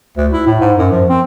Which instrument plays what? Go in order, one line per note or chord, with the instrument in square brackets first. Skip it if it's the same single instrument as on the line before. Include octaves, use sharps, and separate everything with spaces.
[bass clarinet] D2
E4
A2
G#2
F#2
F3
C4